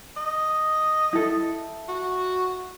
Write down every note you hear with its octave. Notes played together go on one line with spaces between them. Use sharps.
D#5
E4 A4
F#4